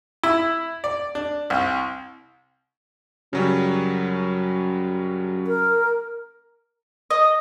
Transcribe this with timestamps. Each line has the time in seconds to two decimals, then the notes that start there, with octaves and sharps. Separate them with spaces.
0.24 E4
0.84 D5
1.15 D4
1.50 C2
3.33 F#2 C#3 F#3 G3
5.47 A#4
7.10 D#5